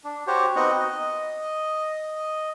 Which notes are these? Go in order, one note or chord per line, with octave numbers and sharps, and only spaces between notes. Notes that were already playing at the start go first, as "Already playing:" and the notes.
D4
F#4 G4 C5 C#5
B3 C4 D#4 F#4 D#5 F#5
D#5